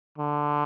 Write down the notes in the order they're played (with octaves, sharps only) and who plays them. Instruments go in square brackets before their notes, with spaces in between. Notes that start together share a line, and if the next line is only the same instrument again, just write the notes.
[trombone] D3